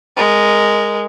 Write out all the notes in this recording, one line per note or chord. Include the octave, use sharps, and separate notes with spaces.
G#3 A#4